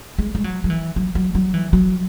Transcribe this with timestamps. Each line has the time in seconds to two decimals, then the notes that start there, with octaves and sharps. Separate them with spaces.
0.19 G#3
0.35 G#3
0.44 F#3
0.64 F#3
0.70 E3
0.96 F#3
1.15 F#3
1.35 F#3
1.54 E3
1.73 F#3